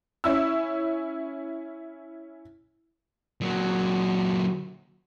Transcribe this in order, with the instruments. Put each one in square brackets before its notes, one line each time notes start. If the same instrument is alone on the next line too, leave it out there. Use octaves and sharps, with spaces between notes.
[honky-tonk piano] C#4 E4 E6
[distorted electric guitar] A#2 F#3